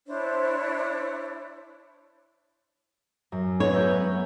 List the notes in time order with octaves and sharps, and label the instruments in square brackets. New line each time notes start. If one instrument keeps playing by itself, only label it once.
[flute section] D4 E4 C5 C#5
[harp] F#2
[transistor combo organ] B3 [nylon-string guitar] C#5
[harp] E5 A#5 G6
G#3